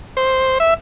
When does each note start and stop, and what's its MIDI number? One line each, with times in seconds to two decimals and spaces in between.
0.17 0.58 72
0.60 0.74 76